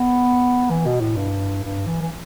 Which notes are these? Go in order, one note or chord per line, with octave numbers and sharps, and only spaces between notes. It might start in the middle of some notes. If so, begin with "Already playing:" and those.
Already playing: B3
E3
B2
A2
G2
G2
E3
E3